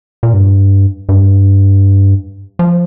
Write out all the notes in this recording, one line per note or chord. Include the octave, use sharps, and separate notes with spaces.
A#2
G2
G2
F3